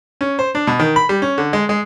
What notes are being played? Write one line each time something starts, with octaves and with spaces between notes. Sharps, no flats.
C#4
C5
D4
B2
D#3
B5
G3
C#4
D3
G#3
G#3